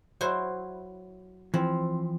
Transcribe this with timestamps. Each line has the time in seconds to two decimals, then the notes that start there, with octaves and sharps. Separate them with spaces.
0.21 F#3 E4 C5
1.54 E3 F3 C4